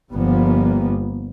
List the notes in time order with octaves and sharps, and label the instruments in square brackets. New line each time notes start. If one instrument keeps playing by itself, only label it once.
[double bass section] G1 F3 G3 A#3 B3